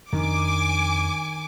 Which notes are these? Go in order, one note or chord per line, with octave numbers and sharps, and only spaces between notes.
F2 D#3 C#4 D4 G#5 D6